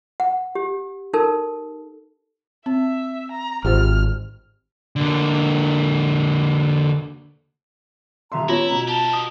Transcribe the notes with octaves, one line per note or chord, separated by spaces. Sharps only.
F#5
G4
D#4 A4 A#4 A5
C4 E5
A#5
G#1 F4 G4 C5 F6
D3 A#3
D#1 E5 A#5 C6
B3 C#4 E4 F4 C#5
B2
G4 A#4 A5
D#6